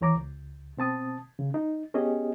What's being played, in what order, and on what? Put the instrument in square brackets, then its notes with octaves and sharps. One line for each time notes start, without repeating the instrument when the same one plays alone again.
[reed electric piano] D#2 E3 C#5 A#5 D6
C#2
B2 C4 A5 D#6
C#3
D#4
B3 C#4 G4 G#4 D#5